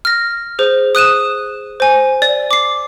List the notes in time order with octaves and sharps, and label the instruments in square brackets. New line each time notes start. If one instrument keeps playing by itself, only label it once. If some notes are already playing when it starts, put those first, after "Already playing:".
[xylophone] F6 A#6
G#4 C5
D#6 F#6 D#7 E7
C5 G#5
D5
D6 C7